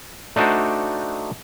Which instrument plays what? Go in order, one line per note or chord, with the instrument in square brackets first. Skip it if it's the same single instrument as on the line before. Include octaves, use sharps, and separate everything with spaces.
[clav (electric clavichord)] A3 D4 D#4 F#4 C5 D5